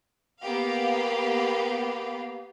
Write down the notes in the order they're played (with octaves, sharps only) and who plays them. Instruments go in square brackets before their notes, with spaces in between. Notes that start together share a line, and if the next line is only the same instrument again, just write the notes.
[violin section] A#3 B3 G4 F5